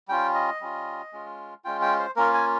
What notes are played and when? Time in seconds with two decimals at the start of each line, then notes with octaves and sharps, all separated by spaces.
0.08 G3 C#4 F4 G5
0.35 D#5
0.61 G3 C#4 F4
1.13 G#3 C#4 F4
1.65 G#3 C#4 F4 G5
1.82 G5
1.99 C5
2.16 A#3 C#4 F4 A#4
2.34 G#5